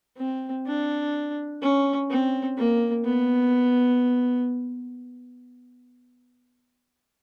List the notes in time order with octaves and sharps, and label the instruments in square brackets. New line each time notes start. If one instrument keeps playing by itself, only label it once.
[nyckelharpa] C4
D4
C#4
C4
A#3
B3